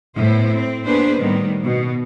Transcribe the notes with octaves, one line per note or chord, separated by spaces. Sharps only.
A2 B3 E4 C5
C4
A#3 B3 D4 G#4 B4 C5
A2 D#3 G3 B3
B2